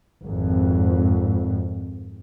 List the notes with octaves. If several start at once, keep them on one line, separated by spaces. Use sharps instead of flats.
G#1 F2